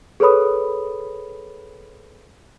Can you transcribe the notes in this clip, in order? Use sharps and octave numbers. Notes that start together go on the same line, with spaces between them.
G#4 A4 B4 C#5 B5 D#6